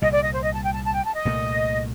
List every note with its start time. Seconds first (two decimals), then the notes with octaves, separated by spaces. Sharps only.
0.01 C2 A#2 G3 D#5
0.11 D5
0.22 D#5
0.32 C5
0.43 D#5
0.53 A5
0.64 G5
0.73 A5
0.84 A5
0.94 G5
1.05 A5
1.15 D#5
1.25 C2 A#2 A3